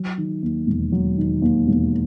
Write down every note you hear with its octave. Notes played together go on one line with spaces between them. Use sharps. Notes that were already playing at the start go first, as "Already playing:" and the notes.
Already playing: F#3
D#3
D#2
E1
F#3
D#3
D#2
E1